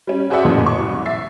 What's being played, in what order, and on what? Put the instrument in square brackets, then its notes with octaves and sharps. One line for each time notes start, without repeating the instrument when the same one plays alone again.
[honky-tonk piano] G3 C#4
F#4 G#4 C5 D5 E5 F#5
A1 F2 A#2 C#3 E3 F3
F#3 C#6
C2
E5 A6 C7